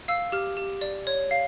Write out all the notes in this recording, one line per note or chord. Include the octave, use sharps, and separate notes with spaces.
F5 E6
G4 F6
G4
D5
C#5
F5